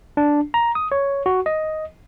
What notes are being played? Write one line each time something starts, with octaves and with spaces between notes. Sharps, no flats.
D4
A#5
D#6
C#5
F#4
D#5